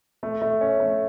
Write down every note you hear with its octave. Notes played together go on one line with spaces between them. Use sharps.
A3
A3
C#4
A3